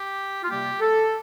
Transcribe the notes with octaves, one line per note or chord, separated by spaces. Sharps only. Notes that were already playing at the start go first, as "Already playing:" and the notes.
Already playing: G4
F4
C3 G3 A#3 G4
A4